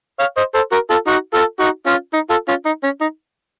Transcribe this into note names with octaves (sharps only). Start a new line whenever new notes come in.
C#5 F5
C5 D#5
A4 C5
F#4 A#4
F4 A4
D#4 F#4
F4 A4
D#4 F#4
C#4 F4
D#4
F4 A4
C#4 F4
D#4
C#4
D#4